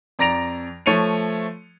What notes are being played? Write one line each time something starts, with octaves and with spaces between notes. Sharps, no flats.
F2 D5 A#5 A#6 D7 F7
F3 A3 C#5 C#7 D#7 F7